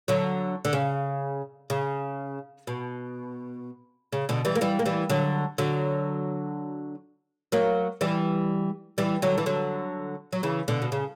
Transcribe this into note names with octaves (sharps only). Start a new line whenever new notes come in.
D3 F#3
D3
C#3
C#3
B2
C#3
B2 D3
E3 G3
A#3
E3 G3
A#3
E3 G3
D3 F#3
D3 F#3
F#3 A#3
E3 G3
E3 G3
D3 F#3
E3
D3 F#3
F#3
C#3 E3
B2 D3
B2
C#3